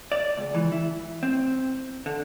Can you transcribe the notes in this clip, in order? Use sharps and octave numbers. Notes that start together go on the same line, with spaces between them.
D5
C#2
E3
E4
C4
D3